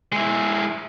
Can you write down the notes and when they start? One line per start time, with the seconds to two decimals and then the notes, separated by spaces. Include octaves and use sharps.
0.12 G#3 E4